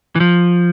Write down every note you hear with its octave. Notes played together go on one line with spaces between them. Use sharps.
E3
F3